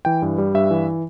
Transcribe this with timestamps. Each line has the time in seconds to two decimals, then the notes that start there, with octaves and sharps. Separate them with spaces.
0.05 E3 G5
0.22 G2
0.38 G3
0.54 G2 E5
0.71 E3